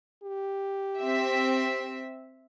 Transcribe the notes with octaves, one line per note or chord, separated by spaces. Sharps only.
G4
C4 E5